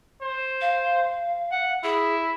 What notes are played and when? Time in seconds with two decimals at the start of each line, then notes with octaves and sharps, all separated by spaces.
0.22 C5
0.61 F5
1.51 F#5
1.83 E4 G#4